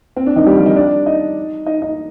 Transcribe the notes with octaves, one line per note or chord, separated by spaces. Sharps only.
C4
D4
D#3 D#4
G3 G4
F3 F4
D#3 D#4
D4 D5
D#4 D#5
D#4 D#5
D#4 D#5